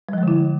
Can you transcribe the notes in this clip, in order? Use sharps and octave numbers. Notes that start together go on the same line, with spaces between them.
D3 F3 G3 G#3 E4